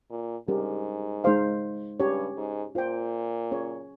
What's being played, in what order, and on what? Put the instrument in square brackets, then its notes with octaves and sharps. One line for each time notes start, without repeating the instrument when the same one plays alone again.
[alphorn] A#2
[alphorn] G#2 [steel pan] G3 C#4 G4 A#4
[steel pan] G#3 D#4 G#4 C5 F5
[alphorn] G2 [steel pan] C#4 G4 C#5
[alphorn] G#2
[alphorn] A#2 [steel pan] F4 C5 G5
[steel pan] C#4 G#4 C#5